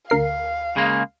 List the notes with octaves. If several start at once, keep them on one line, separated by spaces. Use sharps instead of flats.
D2 A#4 F5 C7
C#3 G#3 A#3